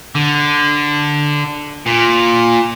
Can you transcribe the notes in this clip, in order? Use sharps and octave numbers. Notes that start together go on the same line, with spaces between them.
D3
A#2